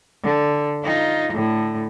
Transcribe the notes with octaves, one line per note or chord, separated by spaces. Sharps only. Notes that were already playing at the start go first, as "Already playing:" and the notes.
D3
D#4 F4
A2 D3